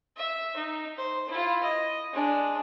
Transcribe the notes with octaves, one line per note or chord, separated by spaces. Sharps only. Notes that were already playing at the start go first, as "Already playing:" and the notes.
E5
D#4
C5
E4 F4
D#5
G#3 D4